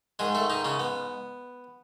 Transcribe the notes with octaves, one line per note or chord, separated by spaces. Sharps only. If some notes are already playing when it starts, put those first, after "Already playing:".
G#2 D#3 G#3 G#4
A3 A4
D#3 D#4
C#3 C#4
B3